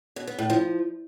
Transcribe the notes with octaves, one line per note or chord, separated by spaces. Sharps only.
B2
B3
A2
F3